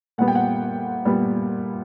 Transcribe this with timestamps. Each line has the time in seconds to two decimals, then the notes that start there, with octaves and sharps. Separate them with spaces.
0.18 A#2 G3 B3 F#5
0.28 G5
0.35 F#5
1.05 A#2 G3 B3